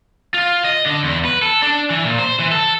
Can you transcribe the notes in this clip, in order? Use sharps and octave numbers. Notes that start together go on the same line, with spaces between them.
F4
D#5
D3
E2
B4
A4
D4
E3
A#2
C5
E3
A4